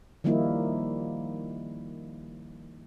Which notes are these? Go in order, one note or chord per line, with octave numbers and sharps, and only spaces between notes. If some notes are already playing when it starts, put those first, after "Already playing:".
D#3 F3 G3 A#3 D#4 E4